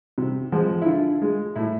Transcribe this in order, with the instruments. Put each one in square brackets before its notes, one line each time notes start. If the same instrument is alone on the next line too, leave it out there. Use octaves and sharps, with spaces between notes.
[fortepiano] C3
F3 G#3
E4
D3 F4
G#3
A2 E4